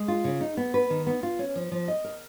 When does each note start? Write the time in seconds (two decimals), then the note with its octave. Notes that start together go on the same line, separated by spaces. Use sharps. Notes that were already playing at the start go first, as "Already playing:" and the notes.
Already playing: G#3
0.08 F4
0.24 C#3
0.41 D#4
0.57 B3
0.74 B4
0.90 D#3
1.06 B3
1.23 F4
1.39 C#4
1.55 F3
1.72 F3
1.88 D#5
2.04 A#4